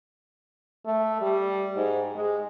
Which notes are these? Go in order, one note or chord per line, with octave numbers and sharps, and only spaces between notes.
A3
G3
G#2
G#3